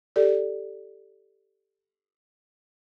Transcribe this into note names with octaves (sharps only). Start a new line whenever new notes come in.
G4 A4 D5